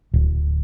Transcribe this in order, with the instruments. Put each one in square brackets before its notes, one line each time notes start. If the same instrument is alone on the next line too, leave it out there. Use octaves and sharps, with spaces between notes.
[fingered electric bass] D1